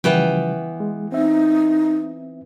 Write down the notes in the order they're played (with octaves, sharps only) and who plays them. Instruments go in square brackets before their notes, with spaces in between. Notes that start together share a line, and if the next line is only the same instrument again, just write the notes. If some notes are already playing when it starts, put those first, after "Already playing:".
[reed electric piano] C#3 F3 G3 [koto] E3 B3 G5
[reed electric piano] G#3
[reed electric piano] C4 E5 [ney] D#4